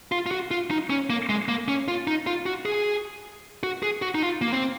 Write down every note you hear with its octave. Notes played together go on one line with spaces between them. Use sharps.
F4
F4
F#4
F4
D#4
C#4
A#3
G#3
A#3
C#4
F4
D#4
F4
F#4
G#4
F#4
G#4
F#4
D#4
F4
A#3
C4